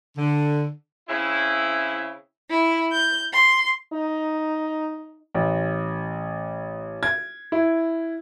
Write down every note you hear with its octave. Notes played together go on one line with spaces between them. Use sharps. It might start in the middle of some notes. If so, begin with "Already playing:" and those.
D3
C#3 C4 E4
E4
G6
C6
D#4
A1
G#6
E4